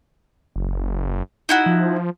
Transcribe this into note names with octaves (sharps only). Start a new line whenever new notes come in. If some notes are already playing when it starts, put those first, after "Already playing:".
F#1
D#4 E4 F#4
F3